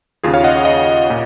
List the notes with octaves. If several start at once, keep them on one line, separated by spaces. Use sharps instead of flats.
D#2 C#3 F4 G#4
C#5 F5
D#5 F#5
D#5 F#5
A#2